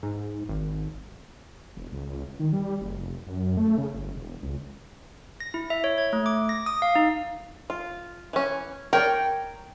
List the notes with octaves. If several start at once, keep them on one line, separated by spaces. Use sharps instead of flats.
G#2
G#1
E1
C#2
D#3
G3
F#1
F1
F#2
A3
C#3
G1
E1
C#2
A#6
E4
E5
C#5
G#6
A3
D6
A#6
D#6
F5
D#4
F4
E3 C#4
A#4 C#5 D5 G5